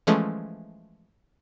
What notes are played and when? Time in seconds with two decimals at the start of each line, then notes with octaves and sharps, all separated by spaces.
0.07 E3 F3 G#3 A3 C#4